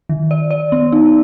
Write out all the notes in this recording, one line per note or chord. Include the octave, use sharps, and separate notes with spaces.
D#3
D5
D5
B3
D#4